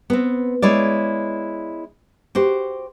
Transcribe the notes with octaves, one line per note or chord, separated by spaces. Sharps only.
B3 C4
G#3 E4 C#5 D5
F#4 G4 C5